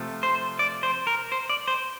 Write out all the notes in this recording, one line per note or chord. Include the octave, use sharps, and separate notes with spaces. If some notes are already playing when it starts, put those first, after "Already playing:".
Already playing: C3 F3 A3
C5
D5
C5
A#4
C5
D5
C5